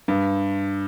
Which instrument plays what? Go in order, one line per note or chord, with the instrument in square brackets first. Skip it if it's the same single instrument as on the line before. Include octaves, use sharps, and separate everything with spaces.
[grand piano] G2